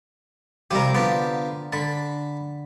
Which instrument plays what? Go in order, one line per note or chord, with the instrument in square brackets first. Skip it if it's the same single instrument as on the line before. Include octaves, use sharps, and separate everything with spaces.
[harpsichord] C3 G3 G4 [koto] F3 A#4
[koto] D3 G4 [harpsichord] B3 F4 A5
[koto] D3 [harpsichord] A5 B5